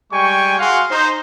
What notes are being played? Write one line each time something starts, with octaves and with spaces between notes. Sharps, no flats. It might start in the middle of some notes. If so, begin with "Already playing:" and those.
G3 G#3 G5 G#5 C#6
F#4 G#4 F5 F#5 C6
D#4 C5